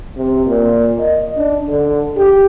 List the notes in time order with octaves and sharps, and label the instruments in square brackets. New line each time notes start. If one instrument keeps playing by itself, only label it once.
[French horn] C3
A#2
D#5
D4
D3
G4